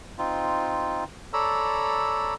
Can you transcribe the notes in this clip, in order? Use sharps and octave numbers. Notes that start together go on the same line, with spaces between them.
C4 D#4 F4
A4 C#5 D5 A#5 B5 E6